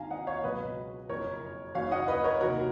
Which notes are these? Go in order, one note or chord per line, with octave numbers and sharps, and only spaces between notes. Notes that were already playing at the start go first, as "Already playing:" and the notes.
Already playing: G#1 G#2 D#3 F5 G#5 A#5
D#5 F#5
C#5 F5
C#2 B2 F#3 B4 D#5
F#1 F2 F3 A#4 C#5
F#1 F#2 D#3 F#3 C#5 F5
D#5 F#5
B4 D#5
A#4 C#5
F1 D#2 D#3 F#4 A#4